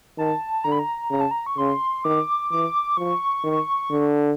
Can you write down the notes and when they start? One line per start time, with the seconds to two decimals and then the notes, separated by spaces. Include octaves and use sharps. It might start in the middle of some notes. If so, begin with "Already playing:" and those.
0.18 D#3 A5
0.64 D3 A#5
0.72 B5
0.79 A#5
1.10 C#3 A#5
1.20 A5
1.31 A#5
1.46 C#6
1.58 C#3 C6
2.04 D#3 D6
2.51 E3 D6
2.97 F3 C#6
3.44 D#3
3.91 D3